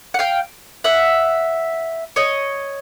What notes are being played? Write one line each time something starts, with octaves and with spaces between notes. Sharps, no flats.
F#5
F5 G5
E5 F#5
C#5 D#5